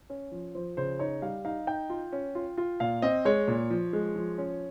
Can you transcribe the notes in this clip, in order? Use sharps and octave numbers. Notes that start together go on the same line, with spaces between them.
C#4
F3
F3 C5
C#3 C5
D#4 C#5
G3 F5
D#4 F5
D#4 G5
F4
C#4
F4
F4
A#2 F5
C4 D#5
G#3 C#5
A#2
F3
G#3
F3
C#4